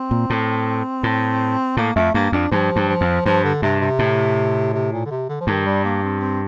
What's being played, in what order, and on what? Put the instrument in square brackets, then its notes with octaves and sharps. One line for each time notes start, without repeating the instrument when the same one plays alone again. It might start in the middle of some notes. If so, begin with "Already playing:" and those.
Already playing: [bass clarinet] C4
[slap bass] A#2
A2
A2
[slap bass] A2 [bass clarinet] A#3
[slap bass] F2 [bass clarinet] A3
[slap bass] G2 [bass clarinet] A#3
[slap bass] F2 [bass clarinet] D4
[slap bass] G2 [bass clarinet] F3
[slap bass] G2
[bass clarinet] F3
[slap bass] F2
[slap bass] G2 [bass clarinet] F3
[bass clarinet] D3
[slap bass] G2 [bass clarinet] C3
[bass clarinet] C3
[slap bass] A2
[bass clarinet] C3
A#2
D3
C3
D3
F3
[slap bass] G2 [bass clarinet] D#3
[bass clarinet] G3
A#3
C4
C4